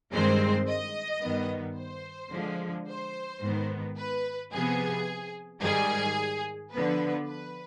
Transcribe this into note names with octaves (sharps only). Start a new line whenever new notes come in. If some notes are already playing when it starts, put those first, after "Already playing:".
G2 D#3 G#3 C4 C5
D#5
G2 D#3 B3
C5
D3 F3 G#3
C5
G#2 D#3 B3
B4
C3 F3 B3 G#4
G#2 D#3 G3 G#4
D3 F3 B3 B4
B4